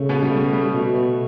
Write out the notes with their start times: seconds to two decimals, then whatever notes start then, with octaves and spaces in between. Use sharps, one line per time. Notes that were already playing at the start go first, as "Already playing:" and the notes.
Already playing: C#3 A3
0.09 B2 B3
0.22 G3
0.31 A3
0.53 G3
0.74 B2 A3
0.95 A3